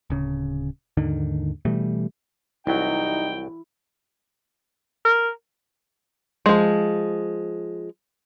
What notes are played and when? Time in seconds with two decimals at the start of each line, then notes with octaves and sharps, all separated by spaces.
0.10 D1 C#3
0.97 D#2 G#2 D3 D#3
1.65 B2 E3 G3 A3
2.67 C2 F#3 D#4 E4 G5
5.05 A#4
6.46 F3 G#3